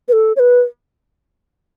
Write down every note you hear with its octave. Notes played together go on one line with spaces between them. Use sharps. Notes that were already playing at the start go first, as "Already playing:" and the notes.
B4
A4
C#5
B4